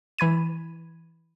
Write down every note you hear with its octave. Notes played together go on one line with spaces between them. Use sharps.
E3 B5 G#6 D#7